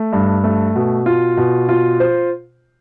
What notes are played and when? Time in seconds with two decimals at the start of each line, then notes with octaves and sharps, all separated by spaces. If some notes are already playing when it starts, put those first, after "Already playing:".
Already playing: A3
0.13 G2
0.44 A3
0.76 B2
1.06 F4
1.37 B2
1.69 F4
2.00 C5